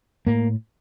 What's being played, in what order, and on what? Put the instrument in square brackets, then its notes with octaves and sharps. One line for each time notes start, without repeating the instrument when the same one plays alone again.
[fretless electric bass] A2 A#3